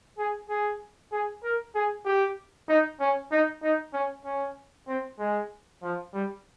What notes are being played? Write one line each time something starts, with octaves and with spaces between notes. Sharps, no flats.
G#4
G#4
G#4
A#4
G#4
G4
D#4
C#4
D#4
D#4
C#4
C#4
C4
G#3
F3
G3